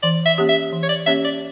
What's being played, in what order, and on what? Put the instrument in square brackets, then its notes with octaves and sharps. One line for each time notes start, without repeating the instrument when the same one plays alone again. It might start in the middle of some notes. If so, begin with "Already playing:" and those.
[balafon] E3 [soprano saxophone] D5
[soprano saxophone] E5
[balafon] A#3 C#4 G4 C#5
[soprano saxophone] E5
[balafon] E3
[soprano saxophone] C#5
D5
[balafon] A#3 C#4 G4 C#5 [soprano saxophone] E5
[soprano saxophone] D5